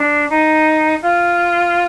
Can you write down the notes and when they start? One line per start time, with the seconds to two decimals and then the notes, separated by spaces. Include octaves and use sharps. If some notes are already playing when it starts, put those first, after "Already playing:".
Already playing: D4
0.30 D#4
1.02 F4